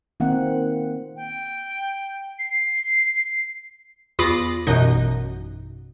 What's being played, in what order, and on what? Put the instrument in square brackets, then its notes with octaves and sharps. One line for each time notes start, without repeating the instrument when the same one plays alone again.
[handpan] D#3 A#3 C4 F#5
[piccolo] G5
C7
[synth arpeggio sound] E2 F4 B5 D6 D#6 A#6
A1 F#2 B2 D#4